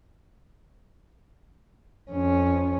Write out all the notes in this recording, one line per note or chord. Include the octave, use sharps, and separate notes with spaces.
F2 C#4